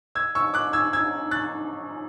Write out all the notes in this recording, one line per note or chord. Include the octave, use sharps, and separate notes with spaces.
E6 G#6
C#6 E6
D6 F#6
E6 G#6
E6 G#6
F#6 A6